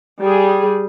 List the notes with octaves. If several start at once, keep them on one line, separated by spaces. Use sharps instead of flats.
G3 G#4